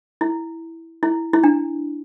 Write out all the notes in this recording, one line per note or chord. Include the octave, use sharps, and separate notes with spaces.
E4
E4
E4
D4